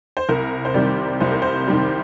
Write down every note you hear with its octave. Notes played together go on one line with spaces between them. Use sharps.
C5
C2 A#4
C5
C3 D#3 G3 D5
C2 C5
A#4
C5
C3 D#3 G3